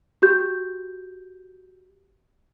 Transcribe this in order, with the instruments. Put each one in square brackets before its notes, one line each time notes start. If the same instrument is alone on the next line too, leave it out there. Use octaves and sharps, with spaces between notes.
[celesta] F#4 G4 G6